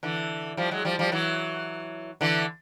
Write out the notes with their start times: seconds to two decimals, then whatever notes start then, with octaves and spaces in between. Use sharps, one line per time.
0.03 D3 E3
0.57 F3 G3
0.71 F#3 G#3
0.85 F3 G3
0.99 F3 G3
1.12 E3 F#3
2.21 D3 E3